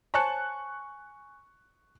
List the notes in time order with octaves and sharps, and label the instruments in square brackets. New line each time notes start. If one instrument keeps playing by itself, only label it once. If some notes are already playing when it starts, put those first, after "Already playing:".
[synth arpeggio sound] C5 C#5 A5 [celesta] G#5 C#7 [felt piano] C#6 F#6